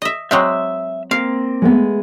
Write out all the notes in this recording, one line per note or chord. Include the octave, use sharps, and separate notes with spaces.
D#5 E5
F#3 G#3 C4 E5 E6
A#3 C4 F5
G#3 A3 B3